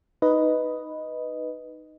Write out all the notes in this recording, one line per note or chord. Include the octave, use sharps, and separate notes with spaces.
D#4 B4 D#5